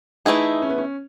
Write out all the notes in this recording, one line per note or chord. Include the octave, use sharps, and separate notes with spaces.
E3 A3 D#4 E4 G#4
C#4
B3
C#4